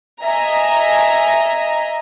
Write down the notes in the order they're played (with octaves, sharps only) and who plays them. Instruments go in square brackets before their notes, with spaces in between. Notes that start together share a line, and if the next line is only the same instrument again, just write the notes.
[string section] D#5 E5 G#5 A#5